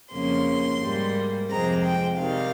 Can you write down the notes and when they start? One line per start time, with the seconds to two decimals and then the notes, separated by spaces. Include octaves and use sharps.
0.13 F2 C#3 F3 A#3 C#4 C6
0.81 G#2 G3 A#3
1.50 F2 C3 F3 G#3 C4 A#5
1.83 G5
2.18 C3 D#3 G3 F5